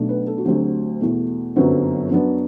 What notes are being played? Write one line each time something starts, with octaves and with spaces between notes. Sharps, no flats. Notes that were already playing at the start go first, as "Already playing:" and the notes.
Already playing: B1 B2 A3 D4
B4
A4
F#4
D2 D3 F#3 C4 G4
E2 B2 A3
G1 F#2 D3 F#3 C4 B4
F#2 F#3 B3 D4